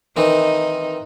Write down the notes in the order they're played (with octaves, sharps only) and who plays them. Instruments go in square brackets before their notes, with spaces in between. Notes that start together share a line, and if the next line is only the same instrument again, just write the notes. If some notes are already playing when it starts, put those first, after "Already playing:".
[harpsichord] D#3 E3 C4 [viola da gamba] D#4